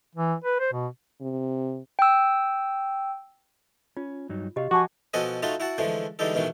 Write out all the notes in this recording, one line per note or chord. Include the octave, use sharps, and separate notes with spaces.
E3
B4
C5
B2
C3
G5 E6
C#4 F4
G2 F#3 D#4
C3 F#4 G4 D#5 F5
F3 F#4 F#5 G#5 A5 C#6 D6
B2 F3 F#4 A4 D#5 G#5
A3 D#4 F4 F#4 A5 B5
E4 F#4 F#5 A5
D3 E3 F3 G#3 A3
D3 E3 G3 G#3 D#4 A4
G2 B2 D#3 E3 A3